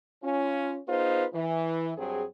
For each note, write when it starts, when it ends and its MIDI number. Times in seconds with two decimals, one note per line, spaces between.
0.23 0.77 61
0.23 0.77 65
0.87 1.24 59
0.87 1.24 63
0.87 1.24 65
0.87 1.24 68
0.87 1.24 71
0.87 1.24 72
1.33 1.92 52
1.96 2.23 43
1.96 2.23 54
1.96 2.23 60
1.96 2.23 68